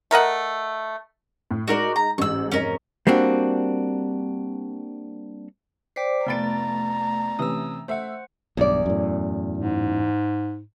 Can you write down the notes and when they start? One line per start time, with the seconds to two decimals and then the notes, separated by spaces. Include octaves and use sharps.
0.11 A3 A#4 D#5 F#5
1.51 A2
1.68 G#3 D#4 F#4 A#4 D5
1.96 A#5
2.18 A1 G#2 C#6 E6 F#7
2.52 F1 G#2 C#4 A#4 D#5
3.07 G3 A#3 C4 D4 F#4
5.96 C5 D5 G5 D6 B6 C7
6.26 F1 A3 B3 D5 A#5 B5 A6 D7
7.39 C3 E3 C#4 D#6 E6
7.88 A3 C5 E5 F#5
8.57 B1 E2 G2 D5
8.86 F#2 A2
9.58 G#2